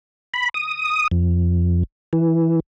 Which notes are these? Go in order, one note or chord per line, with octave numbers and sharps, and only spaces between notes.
B5
D#6
F2
E3